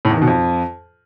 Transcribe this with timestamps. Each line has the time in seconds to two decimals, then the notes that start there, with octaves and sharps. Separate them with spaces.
0.05 A2
0.10 E2
0.16 D#3
0.22 B2
0.27 F2